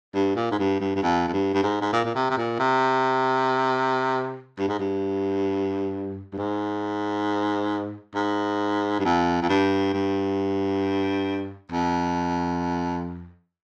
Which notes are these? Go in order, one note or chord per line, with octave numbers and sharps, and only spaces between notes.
G2
A#2
G#2
G2
G2
G2
F2
F2
G2
G2
G#2
G#2
A#2
A#2
C3
C3
A#2
C3
G2
G#2
G2
G2
G#2
G#2
G2
F2
F2
G2
G2
F2